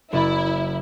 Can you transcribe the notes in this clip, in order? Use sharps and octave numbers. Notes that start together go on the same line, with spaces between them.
F#1 E4 A6